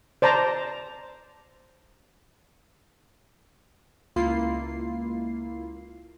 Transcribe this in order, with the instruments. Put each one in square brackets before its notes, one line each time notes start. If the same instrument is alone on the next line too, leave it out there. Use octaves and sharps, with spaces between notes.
[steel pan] C5 D5 A5 A#5
[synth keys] C#2 A#3 E4 F4 C7